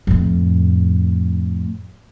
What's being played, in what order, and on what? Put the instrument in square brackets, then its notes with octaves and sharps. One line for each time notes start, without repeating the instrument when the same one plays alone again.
[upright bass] F2 A2